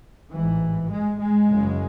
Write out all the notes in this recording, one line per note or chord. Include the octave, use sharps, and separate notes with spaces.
A1 G#2 E3
G#3
G#3
F#1 F#2 C#3